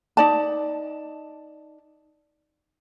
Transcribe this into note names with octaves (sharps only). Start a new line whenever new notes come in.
D#4 D5 A5